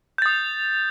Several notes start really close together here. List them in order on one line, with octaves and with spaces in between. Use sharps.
G6 A6 D#6